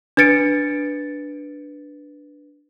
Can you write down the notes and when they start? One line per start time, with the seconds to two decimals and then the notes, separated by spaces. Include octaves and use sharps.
0.17 D4 B4 A6 C#7 D7